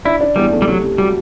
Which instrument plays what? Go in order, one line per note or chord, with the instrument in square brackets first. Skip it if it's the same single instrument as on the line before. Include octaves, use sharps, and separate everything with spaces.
[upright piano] D4 [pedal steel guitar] E4
[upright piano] D4
[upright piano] E2 [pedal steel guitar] G3
[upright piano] A3
[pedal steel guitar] G3
[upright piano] C3 [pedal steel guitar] F#3
[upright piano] C3
[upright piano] F#3 [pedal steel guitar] G3